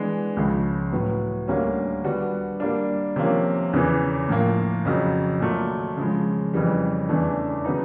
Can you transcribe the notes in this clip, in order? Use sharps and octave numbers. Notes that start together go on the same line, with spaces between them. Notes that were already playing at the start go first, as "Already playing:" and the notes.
Already playing: E3 G#3 B3 D4
C#2 C#3 F3
A2 F#3 B3
D2 D3 G3 A#3 C#4
D3 G3 B3 D4 F#4
G3 A#3 D4
C3 F3 A#3 C#4
E2 C#3 E3
A2 F3 A#3
F2 C#3 F#3
A#2 F#3 A3
C#3 F3 G#3
F2 C#3 E3 G3
E2 C#3 E3 A3 D4
C#3 F#3 B3 D#4